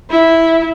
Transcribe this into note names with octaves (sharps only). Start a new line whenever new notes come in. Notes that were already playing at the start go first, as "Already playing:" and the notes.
E4